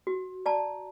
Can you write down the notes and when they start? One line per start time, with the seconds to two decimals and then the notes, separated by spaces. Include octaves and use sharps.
0.07 F#4
0.46 D5 A5 A#5